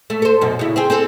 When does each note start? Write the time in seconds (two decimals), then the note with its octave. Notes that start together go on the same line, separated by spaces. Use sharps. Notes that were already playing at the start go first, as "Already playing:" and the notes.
0.10 A3
0.22 A4 C5
0.41 F#2 B2
0.59 C#3 E4
0.76 C4 G#4
0.90 C4 G#4 A4